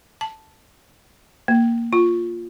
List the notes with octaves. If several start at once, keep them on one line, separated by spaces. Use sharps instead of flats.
A5
A#3
F4